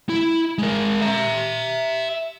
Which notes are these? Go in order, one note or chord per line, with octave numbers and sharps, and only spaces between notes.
E4
G#3 A#4
E5 A#5